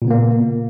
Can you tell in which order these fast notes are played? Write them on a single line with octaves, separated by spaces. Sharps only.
A#2 C#3 B3 A#3